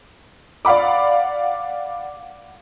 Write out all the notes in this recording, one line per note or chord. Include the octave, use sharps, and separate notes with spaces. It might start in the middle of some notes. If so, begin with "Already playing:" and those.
D5 F5 F#5 B5 D6